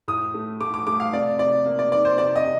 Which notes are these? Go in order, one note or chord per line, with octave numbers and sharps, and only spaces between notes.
A2 D#6
A3
A3 D6
D6
A3 D6
F5
C3 D5
C3 D5
A#3
D5
D#3 D5
C5
C3 D5
D#5
C3